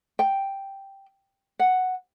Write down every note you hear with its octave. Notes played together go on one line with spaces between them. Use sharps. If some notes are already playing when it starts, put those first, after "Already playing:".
G5
F#5